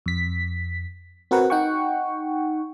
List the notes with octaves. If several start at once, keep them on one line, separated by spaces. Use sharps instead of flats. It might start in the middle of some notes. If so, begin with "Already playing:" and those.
F2 B6
C4 F#4 A#4 B4 F#5
D#4 F#5 G5 C#6